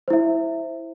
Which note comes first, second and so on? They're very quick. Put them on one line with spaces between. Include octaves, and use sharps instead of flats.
C5 E4 E5